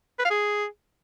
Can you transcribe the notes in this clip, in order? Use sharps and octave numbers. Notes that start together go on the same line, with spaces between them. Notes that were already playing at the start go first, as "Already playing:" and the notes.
B4
F5
G#4